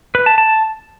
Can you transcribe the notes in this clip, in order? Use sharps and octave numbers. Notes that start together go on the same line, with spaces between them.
B4
A5
A5